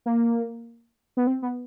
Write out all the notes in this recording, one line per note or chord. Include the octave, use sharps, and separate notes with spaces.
A#3
B3
C4
B3